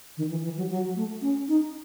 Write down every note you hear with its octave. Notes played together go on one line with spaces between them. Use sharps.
D#3
E3
E3
F#3
F#3
A3
C#4
D#4